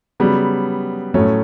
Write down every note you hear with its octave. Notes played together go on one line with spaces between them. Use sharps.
C#3 F#3 G3 B3
A2 F#3 A3 C#4